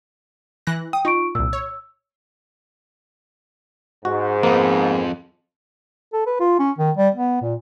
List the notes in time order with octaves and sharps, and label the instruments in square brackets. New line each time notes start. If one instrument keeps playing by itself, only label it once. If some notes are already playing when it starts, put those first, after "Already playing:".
[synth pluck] E3 F#6 A#6
[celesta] G5 [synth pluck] D#6
[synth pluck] D#4 [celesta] F4 C#6 D7
[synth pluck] C2 A#2 [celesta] E6
[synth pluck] C#5
[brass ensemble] G#2 [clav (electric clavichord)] F#4
[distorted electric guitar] F2 [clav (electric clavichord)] A#3 B3
[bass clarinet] A4
B4
F4
C#4
D#3
G3
B3
A#2